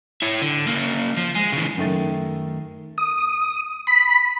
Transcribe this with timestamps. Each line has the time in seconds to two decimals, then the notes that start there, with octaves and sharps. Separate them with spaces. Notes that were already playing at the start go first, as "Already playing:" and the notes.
0.22 E4 C#5
0.42 D3
0.68 C#3 A#3
1.17 F3
1.35 G#3
1.53 C#3 E3
1.77 F#2 D#3 A3 A6
2.98 D#6
3.87 B5